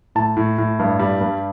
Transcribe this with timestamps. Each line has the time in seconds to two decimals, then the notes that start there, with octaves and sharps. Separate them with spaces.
0.15 A2 A5
0.37 A2
0.58 A2
0.79 G2
0.99 G3
1.21 G2